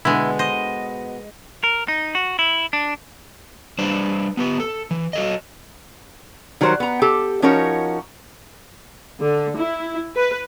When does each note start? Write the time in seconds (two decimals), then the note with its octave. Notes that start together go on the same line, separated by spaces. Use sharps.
0.05 B2 D3 G#3 B3 E4
0.39 C5 D#5
1.64 A#4
1.88 D#4
2.15 F#4
2.39 E4
2.73 D4
3.78 G3 D4 B4 C5 D5
4.37 B3 G4 B4
4.60 A4
4.91 E3
5.13 F#4 A4 D#5
6.61 D#3 F#3 G3 A#4 C5
6.80 B3 A#5
7.02 G4 A4
7.42 F3 C#4 D#4 F#4 A#4 C#5
9.21 D3
9.56 E4
10.16 B4